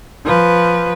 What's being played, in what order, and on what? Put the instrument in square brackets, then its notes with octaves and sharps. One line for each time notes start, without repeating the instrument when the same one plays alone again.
[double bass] F3 [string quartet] B4